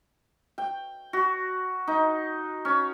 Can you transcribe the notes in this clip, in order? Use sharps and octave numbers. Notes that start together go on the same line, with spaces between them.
G5
F#4
D#4
C#4